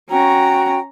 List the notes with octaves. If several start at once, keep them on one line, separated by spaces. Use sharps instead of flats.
C#4 F#4 G5 A#5